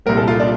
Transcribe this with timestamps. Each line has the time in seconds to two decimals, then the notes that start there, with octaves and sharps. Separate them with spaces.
0.06 C2 A#2 G3 A#4
0.17 A4
0.28 F4
0.40 D4